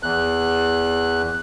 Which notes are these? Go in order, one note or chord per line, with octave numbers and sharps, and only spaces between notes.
E2 F#6